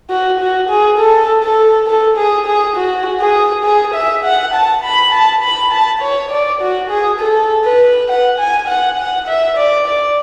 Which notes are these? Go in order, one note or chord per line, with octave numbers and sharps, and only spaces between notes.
F#4
F#4
G#4
A4
A4
A4
G#4
G#4
F#4
G#4
G#4
E5
F#5
A5
B5
A5
B5
A5
C#5
D5
F#4
G#4
A4
B4
F#5
G#5
F#5
F#5
E5
D5
D5